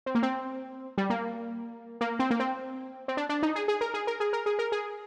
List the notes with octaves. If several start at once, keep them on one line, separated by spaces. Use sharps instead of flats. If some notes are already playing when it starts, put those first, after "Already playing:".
C4
A#3
C4
G3
A#3
A#3
C4
A#3
C4
C4
D4
D4
D#4
G#4
G#4
A#4
G#4
A#4
G#4
A#4
G#4
A#4
G#4